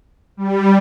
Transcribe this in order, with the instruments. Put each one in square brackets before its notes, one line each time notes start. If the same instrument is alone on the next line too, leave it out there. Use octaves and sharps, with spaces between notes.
[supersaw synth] G3